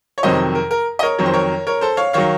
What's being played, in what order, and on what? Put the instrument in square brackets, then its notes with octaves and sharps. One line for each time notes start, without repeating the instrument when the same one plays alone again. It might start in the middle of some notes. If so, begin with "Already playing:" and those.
[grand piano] C#5
F2 C3 D#3 F#3 C5 D#5
A#4
A#4
D#5
A#4 C#5
F2 D#3 F#3 C#5
C5
A#4 C#5
A#4 C#5
A4 C5
C#5 F5
D#3 F#3 C#5 F5